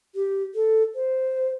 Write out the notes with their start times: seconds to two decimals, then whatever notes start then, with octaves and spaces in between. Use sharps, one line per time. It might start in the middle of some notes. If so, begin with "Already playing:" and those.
0.15 G4
0.55 A4
0.95 C5